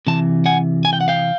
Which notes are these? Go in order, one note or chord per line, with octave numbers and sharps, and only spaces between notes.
C3 E3 A5
F#5 G#5
G#5
G5
F#5
F5 G5